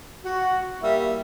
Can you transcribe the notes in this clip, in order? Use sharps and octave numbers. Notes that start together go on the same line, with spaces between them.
F#4
G3 A#3 E4 E5